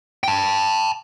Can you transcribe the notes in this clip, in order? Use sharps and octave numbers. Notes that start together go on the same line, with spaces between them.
G5 A5